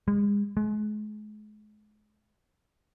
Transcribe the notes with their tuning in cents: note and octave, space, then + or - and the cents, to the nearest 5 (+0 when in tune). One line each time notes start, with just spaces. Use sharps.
G#3 -35
G#3 +35